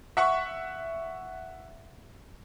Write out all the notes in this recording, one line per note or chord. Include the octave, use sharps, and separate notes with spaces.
E5 F#5 C#6